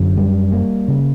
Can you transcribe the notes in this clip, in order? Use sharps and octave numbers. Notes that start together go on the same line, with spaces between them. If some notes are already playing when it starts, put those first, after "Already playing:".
Already playing: F#2 D3
G3
A#3
C#3